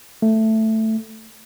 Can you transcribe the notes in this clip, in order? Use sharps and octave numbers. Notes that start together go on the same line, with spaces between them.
A3